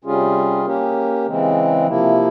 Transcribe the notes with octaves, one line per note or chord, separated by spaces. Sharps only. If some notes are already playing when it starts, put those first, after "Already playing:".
C3 G3 C#4 F4 G#4
A#3 C#4 G4 A#4
C#3 E3 G#3 C4
C3 F3 A#3 E4